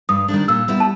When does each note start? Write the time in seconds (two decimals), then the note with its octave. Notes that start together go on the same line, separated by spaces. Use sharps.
0.09 G2 D#6
0.28 D#3 G3 A#3 D4
0.48 A#2 E6
0.68 G3 B3 E4
0.80 A5